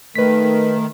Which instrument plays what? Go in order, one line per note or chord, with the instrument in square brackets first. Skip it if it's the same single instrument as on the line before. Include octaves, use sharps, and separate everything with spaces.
[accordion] D#3 [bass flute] A3 [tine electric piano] B4 B6